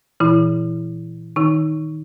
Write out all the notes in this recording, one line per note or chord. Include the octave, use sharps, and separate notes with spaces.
A#2 E3 E4
D#3 D#4